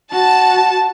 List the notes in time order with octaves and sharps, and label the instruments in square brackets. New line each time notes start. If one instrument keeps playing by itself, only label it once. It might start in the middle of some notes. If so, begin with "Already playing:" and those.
[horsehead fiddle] F#4 [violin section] A5